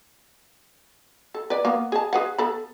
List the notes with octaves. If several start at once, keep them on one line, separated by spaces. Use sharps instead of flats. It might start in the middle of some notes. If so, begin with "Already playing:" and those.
A4
B4 D5
A#3 B3
G#4 A5
G#4 B4 F#5
B3 A4 B5